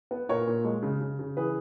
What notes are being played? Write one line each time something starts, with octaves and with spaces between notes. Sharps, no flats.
B3
A#2 A#4 C#5
A#2
G#3
C#3
C#3
C#3
E3 G#4 B4